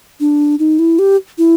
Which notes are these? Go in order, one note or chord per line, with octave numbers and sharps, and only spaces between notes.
D4
D#4
E4
G4
E4